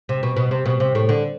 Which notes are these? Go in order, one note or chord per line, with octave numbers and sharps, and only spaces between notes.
C3
B2
B2
C3
B2
C3
A2
D3